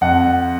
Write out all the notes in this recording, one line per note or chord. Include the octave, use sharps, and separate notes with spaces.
F2 F#5